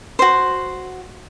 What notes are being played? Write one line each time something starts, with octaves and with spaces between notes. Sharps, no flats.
F#4 C5